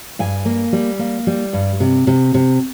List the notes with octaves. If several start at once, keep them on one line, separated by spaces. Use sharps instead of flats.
G2 F5 G#5
A#3
G3
A#3
G3
G2
C3
C3
C3